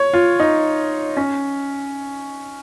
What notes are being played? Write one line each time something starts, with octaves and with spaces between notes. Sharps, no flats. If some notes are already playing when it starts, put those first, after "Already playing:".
Already playing: C#5
F4
D#4
C#4